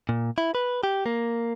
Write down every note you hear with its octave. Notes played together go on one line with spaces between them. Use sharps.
A#2
E4
B4
G4
A#3